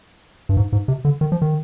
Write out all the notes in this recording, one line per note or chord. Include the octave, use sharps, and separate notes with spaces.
G2
G#2
G#2
C3
D3
D#3
F3
D#3